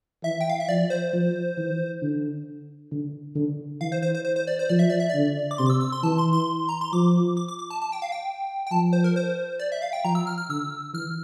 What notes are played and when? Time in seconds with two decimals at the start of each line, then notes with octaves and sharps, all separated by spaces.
0.23 E3 E5
0.41 G5
0.50 F5
0.60 E5
0.68 F3 D5
0.90 C5
1.13 F3
1.58 E3
2.02 D3
2.91 D3
3.35 D3
3.81 E3 F5
3.92 C5
4.02 C5
4.14 C5
4.25 C5
4.36 C5
4.47 D5
4.59 C5
4.69 F3 D5
4.79 E5
4.90 D5
5.00 E5
5.09 D3 D5
5.51 D6
5.58 C3 C6
5.66 D6
5.70 E6
5.81 E6
5.92 C6
6.03 E3 A5
6.18 C6
6.33 C6
6.69 A#5
6.81 C6
6.93 F3 D6
7.37 D6
7.48 D6
7.59 D6
7.70 A5
7.81 A5
7.92 G5
8.02 F5
8.12 G5
8.67 G5
8.71 F3 A5
8.93 C5
9.04 A#4
9.16 C5
9.59 D5
9.72 E5
9.82 F5
9.93 G5
10.04 F3 A#5
10.15 E6
10.27 F6
10.38 F6
10.49 D3 E6
10.94 E3 F6